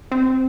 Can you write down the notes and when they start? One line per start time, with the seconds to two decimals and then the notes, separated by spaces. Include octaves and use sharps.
0.11 C4